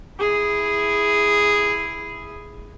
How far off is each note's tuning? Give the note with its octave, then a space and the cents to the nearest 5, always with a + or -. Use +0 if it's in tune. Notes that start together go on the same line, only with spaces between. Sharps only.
E4 +0 G#4 -5